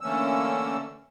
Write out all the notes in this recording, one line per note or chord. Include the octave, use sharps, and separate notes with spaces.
D3 E3 A3 A#3 C#4 E6